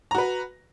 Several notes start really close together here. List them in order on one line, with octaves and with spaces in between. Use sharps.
A#5 F#4 B4